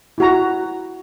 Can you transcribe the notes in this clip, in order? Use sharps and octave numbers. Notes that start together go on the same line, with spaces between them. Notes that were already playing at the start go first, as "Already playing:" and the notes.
E4 F#4 A#5